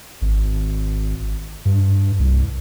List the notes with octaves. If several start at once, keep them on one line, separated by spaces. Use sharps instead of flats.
G#1
G2
C2